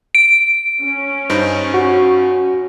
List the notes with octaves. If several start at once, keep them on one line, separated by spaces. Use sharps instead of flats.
D7
C#4
G2 D#4 C5
F#4